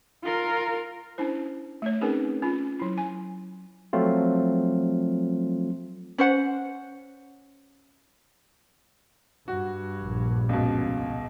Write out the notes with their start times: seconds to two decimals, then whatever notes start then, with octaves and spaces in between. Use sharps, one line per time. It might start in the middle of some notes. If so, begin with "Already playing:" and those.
0.24 F4 A#4
1.18 C#4 D4 E4 C5
1.82 A3 C#5
2.01 C4 C#4 D#4 G#4 A#4 B4
2.42 C#4 F4
2.80 F#3 E4
2.98 G#5
3.93 F3 F#3 A3 C4 F4
6.18 C#4 C5 F#5
9.48 G2 F#4
10.01 A#1
10.49 C#2 B2